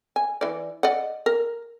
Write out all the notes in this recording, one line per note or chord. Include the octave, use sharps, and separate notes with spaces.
G#5
E3 D5
D5 D#5 F#5
A#4